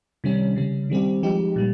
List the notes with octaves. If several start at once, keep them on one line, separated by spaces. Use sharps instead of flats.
C3 D#3 G3 C#4
C#3 G3 C#4
D#3 G3 C4 G4
F3 G#3 D#4 G4
A#2 G3